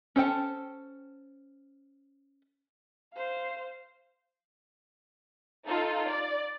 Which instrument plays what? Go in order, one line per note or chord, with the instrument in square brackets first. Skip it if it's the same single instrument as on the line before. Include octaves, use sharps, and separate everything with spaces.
[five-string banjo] C#4 A4 C5 G5 A5
[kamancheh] C5 F5
[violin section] D#4 F4 A4
D5